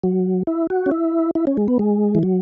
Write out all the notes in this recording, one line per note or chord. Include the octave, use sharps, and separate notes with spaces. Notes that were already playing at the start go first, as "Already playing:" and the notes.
F#3
E4
F#4
C#4
E4
E4
C#4
G#3
B3
G#3
E3
F#3